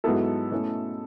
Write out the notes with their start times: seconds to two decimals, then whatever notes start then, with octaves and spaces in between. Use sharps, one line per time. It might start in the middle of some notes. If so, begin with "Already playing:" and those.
0.04 G#2 F#3 B3 E4 A4
0.51 B2 A3 C#4 E4